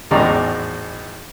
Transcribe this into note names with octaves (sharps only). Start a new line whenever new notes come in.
G#1 E2 A2 G#3 D5 A#5